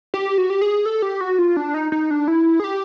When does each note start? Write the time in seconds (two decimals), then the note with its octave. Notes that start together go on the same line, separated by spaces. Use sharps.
0.14 G4
0.38 F#4
0.50 G4
0.62 G#4
0.86 A4
1.02 G4
1.21 F#4
1.38 F4
1.56 D4
1.74 D#4
1.92 D#4
2.11 D4
2.28 E4
2.60 G#4
2.64 G4